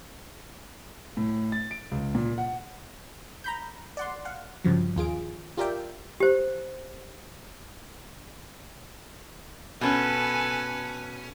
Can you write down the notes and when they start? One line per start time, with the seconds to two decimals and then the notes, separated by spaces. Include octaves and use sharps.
1.17 A2
1.52 A6
1.71 D7
1.91 C#2
2.15 A#2
2.38 F#5
3.44 A#5 B5 G6
3.97 D5 F#5 C6
4.25 F5 F#5
4.64 G2 C#3 F3 F#3
4.96 D#2 F4 G#4 D7
5.57 F4 G4 A#4 D5 E5 G5
6.20 G4 C5
9.81 B2 C#4 A4 B4 G#5